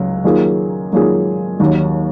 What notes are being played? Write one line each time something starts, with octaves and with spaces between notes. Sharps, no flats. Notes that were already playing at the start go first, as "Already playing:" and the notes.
Already playing: C#2 F#3
D#3 F#3 A#3 F4 G#4
D#3 F#3 A#3 F4 G#4
D#2 D#3 F#3